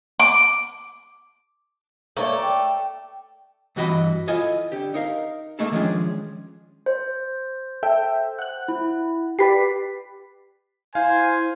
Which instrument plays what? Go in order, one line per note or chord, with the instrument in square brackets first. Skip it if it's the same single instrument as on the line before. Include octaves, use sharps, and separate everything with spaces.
[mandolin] D6
[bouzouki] A3 [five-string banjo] A#3 C#5 D5
[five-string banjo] D5 [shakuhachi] G5
[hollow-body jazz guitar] G2 E3 F#4 D#5 B5
E4 F4 A4 D#5 G#5
D3 G4
D#4 A#4 F5
A3 A#3 D#4 G#4 A4
D#3 F3 G#3 C#4 D4 G#4
[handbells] C5
[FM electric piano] A4 E5 G5
F#5 F#6
[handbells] E4
[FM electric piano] G4 B4 D5 [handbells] B6 C7
[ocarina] E4 [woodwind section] C5 [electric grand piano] F5 [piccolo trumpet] G#5